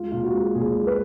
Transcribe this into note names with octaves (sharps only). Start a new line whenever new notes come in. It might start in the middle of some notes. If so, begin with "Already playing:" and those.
Already playing: G#3 F4
A#2 F4
F#4
G#3
A#2 G#4
G#3
B4